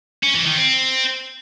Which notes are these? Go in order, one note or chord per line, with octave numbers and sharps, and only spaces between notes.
C#4
E3
D#3
C4